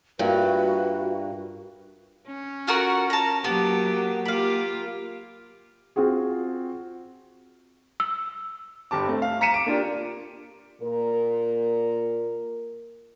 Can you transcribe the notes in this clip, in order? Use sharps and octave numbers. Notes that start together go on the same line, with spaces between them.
G2 A#3 F4 F#4 B4 E5 F5
C#4
F4 F#4 A#4
A5 A#5
F#3 A#3 B3 G4
A#3 F4 G4 F5 B5
C4 F4 F#4 G#4
E6
G1 G4 A5 D6
A3 C4
F5
A#5 B6 C#7 D#7 E7
D6 D7
A#3 D4 F4 G4
A#2 A#4